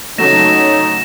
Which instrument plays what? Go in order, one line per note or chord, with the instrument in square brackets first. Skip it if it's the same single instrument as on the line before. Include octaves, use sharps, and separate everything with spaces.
[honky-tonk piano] C#3 F#3 A3 [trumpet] D#4 [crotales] A#6 E7